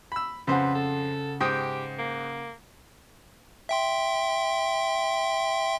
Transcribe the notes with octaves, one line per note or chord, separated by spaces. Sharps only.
B5 E6
F2 C#3 B4 C5 F#5
A4
G#2 G4 G5 D#6
A#3
E5 G5 C6